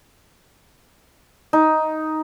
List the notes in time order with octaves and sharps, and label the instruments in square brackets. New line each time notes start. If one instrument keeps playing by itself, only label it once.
[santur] D#4